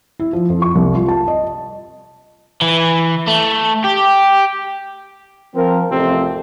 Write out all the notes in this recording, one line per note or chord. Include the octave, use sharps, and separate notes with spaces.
E4
F3
F2
C#6
C2
F4
A5
D#5
E3
A3
G4
F3 C4 A#4
A1 F2 C3 F3 C4 A4